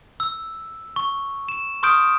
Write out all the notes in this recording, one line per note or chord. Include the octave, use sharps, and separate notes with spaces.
E6
C#6
E7
C6 C#6 D#6 F6 G6 D7